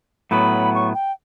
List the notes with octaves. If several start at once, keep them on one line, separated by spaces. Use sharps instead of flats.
A2 F#3 B3 B5
C#6
G5